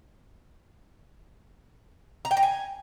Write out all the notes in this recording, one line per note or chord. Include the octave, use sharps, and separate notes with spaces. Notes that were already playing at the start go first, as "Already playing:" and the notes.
A#5
G5
A#5
G#5